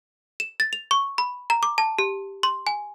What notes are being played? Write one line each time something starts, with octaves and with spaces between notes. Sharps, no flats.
E7
A6
F7
C#6
B5
A#5
D6
A5
G4
C6
G#5